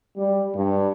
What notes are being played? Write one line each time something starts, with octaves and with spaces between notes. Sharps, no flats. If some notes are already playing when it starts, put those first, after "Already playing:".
G3
G2